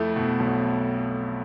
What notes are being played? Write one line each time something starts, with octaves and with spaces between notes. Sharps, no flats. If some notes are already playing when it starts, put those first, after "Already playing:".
Already playing: F2 A3 E4
B2
B1